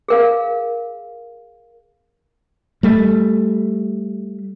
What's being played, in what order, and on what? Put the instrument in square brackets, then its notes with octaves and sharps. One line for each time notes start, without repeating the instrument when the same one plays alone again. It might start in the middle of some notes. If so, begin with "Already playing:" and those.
[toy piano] G#4 A#4 F5
[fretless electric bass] G3 A3